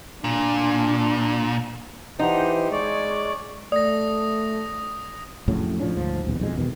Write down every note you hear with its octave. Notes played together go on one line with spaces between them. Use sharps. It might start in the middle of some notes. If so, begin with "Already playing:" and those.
A#2 D4
E3 D#4 G4 C5 F#5 A5 G6
G#3 C#5 D5 C#6
A3 D5 D#6 A#6
F2 A2 C#3 F#3
A2 F3 C#4 D4
D2 G#2 F3
D#1 B1 E2
B1 F2 G#3
E2 B2 D#3